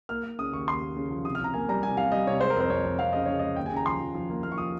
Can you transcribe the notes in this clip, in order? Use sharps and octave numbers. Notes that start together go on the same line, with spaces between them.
A#3 F6
A#3
C#3 D#6
D#2 C#6
D#2 C6
A#3
C#3
F3
C3 D#6
F6
C3 A#5
A#3 G#5
G3 A#5
C3 G#5
C3 F5
G3 D#5
C3 C#5
G#3 C5
A#4
F2 C5
F2 C#5
F2
F2 F5
C#3 D#5
C#3 C#5
G#3 D#5
D#2 G5
G#5
C#3
A#5
F3 C6
F3
F3
A#3
A#3 F6
C#6
F3 D#6